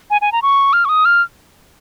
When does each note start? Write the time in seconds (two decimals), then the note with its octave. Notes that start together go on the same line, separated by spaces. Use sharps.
0.10 G#5
0.21 G#5
0.32 A#5
0.42 C#6
0.73 F6
0.85 C#6
0.89 D#6
1.05 F6